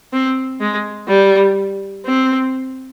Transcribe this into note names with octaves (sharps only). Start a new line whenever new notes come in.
C4
G#3
G3
C4